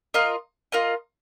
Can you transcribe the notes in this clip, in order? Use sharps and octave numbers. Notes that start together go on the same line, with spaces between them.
F4 A#4 D#5
F4 A#4 D#5